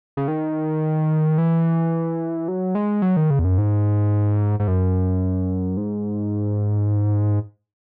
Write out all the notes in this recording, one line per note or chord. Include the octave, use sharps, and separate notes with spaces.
C#3
D#3
E3
F#3
G#3
F#3
D#3
C#3
E2
F#2
G#2
G#2
F#2
G#2